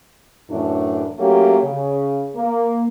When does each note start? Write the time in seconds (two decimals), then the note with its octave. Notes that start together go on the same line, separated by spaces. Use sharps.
0.50 F#2 A2 E3 A3 D4
1.19 F#3 A3 A#3 C#4 G4
1.63 C#3
2.36 A#3